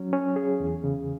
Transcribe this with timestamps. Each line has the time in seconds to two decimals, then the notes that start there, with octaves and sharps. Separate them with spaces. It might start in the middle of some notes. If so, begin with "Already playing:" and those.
Already playing: F#3 C#4
0.13 C#4
0.36 G#4
0.60 E2
0.84 C#3